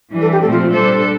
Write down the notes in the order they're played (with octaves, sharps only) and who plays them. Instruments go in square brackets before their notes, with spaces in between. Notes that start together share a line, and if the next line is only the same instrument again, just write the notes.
[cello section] E3 G3 D4
[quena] A4
G4
[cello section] A#2 F3 A3 C4 [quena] A4
[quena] F4
[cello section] G3 D4 A4 [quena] C5